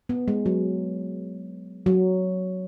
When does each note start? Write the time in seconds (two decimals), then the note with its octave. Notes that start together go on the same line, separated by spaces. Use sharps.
0.09 B3
0.28 G#3
0.46 F#3
1.86 F#3